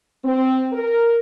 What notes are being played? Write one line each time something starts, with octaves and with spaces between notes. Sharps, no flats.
C4
A#4